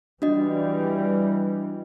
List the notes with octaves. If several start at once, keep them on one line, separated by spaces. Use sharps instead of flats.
E3 G3 D4 F#4 D#5